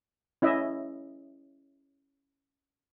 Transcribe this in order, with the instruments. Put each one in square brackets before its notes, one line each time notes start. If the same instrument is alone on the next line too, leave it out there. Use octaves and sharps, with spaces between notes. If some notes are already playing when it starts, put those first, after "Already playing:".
[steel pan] C#4 E4 D#5 E5